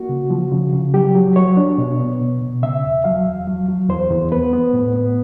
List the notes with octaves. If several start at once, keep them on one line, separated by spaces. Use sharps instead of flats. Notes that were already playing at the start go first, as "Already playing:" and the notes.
Already playing: A#3 F#4
C#3
F3
C#3
C#3
F#3 G4
F#3
F#3 C#5
D4
B2
B3
B2
B2
C#3 E5
E2
F#3 F5
E2
F#3
F#3
E2 C5
E2
B3 B4
B3
A2
B3